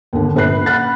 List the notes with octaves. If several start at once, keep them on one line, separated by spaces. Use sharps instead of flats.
D#2 D3
A#1 B4 B5 F#6 C7
F#5 B5 F6 F#6 A6